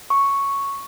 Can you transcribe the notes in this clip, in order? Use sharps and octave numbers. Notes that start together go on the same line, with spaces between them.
C#6